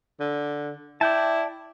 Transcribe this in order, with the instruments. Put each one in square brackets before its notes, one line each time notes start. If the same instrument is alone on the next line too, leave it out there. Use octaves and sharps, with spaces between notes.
[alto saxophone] D3
[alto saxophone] E4 [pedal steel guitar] D5 G5 A5